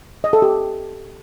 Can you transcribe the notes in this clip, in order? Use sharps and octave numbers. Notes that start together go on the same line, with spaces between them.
D#5
A4
G4